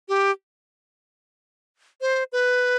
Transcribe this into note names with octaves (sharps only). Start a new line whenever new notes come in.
G4
C5
B4